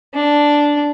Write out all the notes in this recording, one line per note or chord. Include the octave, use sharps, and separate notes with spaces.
D4